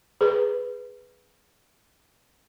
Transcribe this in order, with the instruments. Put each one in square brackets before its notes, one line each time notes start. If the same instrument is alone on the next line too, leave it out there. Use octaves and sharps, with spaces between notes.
[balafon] G#4 B4